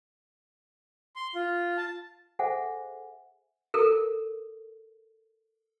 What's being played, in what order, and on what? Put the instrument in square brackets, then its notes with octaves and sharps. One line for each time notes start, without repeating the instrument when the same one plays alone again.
[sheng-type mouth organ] C6
F4
A5
[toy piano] G#4 A4 C5 E5 F#5 G#5
A4 A#4